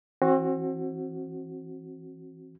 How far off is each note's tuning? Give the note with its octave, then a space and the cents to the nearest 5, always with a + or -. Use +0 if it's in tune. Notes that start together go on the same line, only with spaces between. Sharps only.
E3 +0 C4 +35 F#4 +0